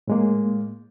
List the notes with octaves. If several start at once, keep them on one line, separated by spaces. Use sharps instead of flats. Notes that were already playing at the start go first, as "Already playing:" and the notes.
A2 G#3 A#3